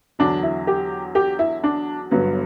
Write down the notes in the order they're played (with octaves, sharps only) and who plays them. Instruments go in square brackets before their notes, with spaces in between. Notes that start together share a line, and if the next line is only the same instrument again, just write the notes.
[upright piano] E2 D3 F#3 D4
E4
G4
G4
E4
D4
G1 G2 F#3 B3